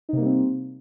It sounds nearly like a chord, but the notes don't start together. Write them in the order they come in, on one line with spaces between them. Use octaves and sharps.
D#4 C3 A#3 G3 C4